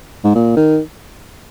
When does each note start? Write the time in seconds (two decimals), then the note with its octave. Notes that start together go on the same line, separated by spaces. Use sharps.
0.24 G#2
0.35 A#2
0.57 D#3